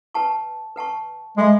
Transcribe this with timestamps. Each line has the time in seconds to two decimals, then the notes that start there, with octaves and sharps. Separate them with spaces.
0.14 B4 F#5 A5 C#6
0.76 B4 F#5 A5 C#6
1.37 G#3 A4 E5 B5